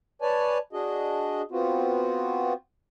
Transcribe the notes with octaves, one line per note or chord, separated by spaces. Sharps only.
B4 C#5 D5 G#5 A5
D4 F#4 G#4 D#5
B3 C4 F4 F#4